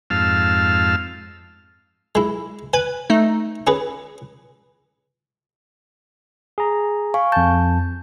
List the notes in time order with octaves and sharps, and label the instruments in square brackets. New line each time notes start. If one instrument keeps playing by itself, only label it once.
[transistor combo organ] F2 G#2 F5 A5 E6 F6
[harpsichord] G#3 E4
[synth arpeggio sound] B4 [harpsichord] G#5
[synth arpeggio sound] A3 D#4
[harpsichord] C#4 G#4 B4
[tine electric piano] G#4 A#5
[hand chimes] F5 G#5 C#6
[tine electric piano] F2 A5 [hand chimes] G6